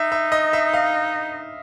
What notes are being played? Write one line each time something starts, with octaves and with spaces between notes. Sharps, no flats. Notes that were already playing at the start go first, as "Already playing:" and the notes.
Already playing: D#4 E5
E5
D#5
E5
F5